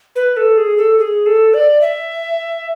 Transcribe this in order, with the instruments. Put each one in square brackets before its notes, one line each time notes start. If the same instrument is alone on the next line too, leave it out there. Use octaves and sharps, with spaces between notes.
[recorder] B4
A4
G#4
A4
G#4
A4
D5
E5